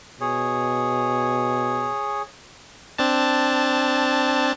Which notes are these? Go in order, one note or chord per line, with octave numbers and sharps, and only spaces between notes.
B2 G#4 C#5
C4 D4 A5